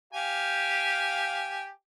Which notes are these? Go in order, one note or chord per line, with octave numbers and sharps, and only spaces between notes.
G4 F5 G#5